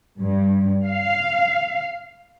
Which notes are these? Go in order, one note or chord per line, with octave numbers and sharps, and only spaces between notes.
G2
F5